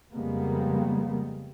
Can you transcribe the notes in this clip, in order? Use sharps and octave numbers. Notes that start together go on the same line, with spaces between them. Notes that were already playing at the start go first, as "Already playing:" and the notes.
F2 C#3 G3 G#3 A#3 B3